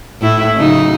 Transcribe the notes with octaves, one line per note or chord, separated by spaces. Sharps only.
A2 E4
C#3 F#3 D#4